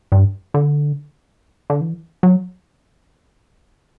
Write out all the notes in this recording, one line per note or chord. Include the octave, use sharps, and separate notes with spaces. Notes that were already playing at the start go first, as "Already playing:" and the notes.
G2
D3
D3
E3
F#3